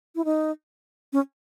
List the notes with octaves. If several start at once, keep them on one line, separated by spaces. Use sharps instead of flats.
E4
D#4
C#4